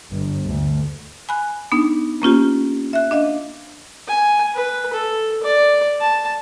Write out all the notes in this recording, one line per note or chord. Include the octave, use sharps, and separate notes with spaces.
G1
D2
G#5 B5 F#6
B3 D4 D#4
A#3 C#4 F4 G4
E5 F#6
D4 D#5 F5
G#5
B4
A4
D5
A5